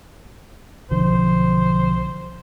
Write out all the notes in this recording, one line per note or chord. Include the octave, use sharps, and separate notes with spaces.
B1 D3 F3 C5